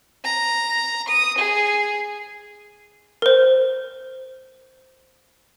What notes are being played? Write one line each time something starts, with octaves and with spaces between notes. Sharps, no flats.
A#5
D#6
G#4
A#4 C5